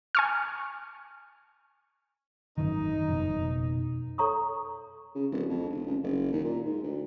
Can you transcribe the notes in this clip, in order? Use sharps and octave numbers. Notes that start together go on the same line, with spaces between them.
G#5 C#6 F6
G#1 F#2 D#3 D#4
F#1 F2 B2
A4 C#5 A#5 C#6 D#6
C#3
D1
F2
F1
C#2
F#1
D#2
A#2
G#2
D2